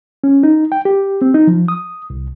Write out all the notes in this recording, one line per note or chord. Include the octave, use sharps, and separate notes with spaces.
C#4
D#4
G5
G4
C4
D#4
F3
D#6
C2